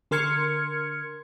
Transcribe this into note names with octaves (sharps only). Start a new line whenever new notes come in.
D3 A#4 C6 F6 G#6 C#7